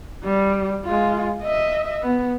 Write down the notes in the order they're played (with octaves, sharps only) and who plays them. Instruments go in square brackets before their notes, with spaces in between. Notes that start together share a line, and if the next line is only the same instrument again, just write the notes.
[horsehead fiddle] G3
G#3 F4
D#5 E5
B3